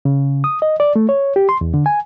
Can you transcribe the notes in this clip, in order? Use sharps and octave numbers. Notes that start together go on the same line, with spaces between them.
C#3
D#6
D#5
D5
A3
C#5
G4
C6
E2
D3
G#5